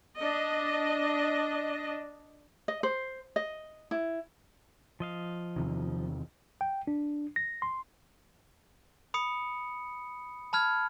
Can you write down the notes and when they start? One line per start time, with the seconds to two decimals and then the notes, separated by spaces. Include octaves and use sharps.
0.19 D4 D#5
2.68 D#5
2.83 C5
3.36 D#5
3.91 E4
5.00 F3 D#5 F5
5.56 E2 C3 D#3
6.61 G5
6.87 D4
7.36 A#6
7.62 C6
9.14 B5 D#6 C#7
10.53 A5 B5 F6 G#6